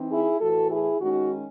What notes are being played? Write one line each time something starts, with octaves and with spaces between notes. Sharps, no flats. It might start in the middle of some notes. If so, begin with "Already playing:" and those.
Already playing: E3 C4 D#4
E4 G#4
A2 E3 A3 F#4 A4
E4 G#4
D#3 G#3 C#4 D#4 F#4